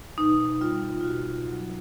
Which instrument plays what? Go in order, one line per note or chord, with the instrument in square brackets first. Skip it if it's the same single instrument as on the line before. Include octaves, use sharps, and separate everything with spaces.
[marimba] B2 D#4
G3 F4
F4
B2 F#4
F#3